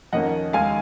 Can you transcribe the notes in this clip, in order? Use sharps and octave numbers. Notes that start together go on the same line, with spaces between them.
F2 D#3 A#3 C#4 D#5 F#5
D#2 D#3 G#3 F5 G#5